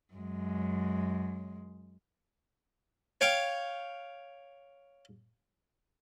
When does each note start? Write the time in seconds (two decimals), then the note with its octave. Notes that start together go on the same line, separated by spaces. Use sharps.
0.13 F#2 G#3
3.21 C#5 F5 G5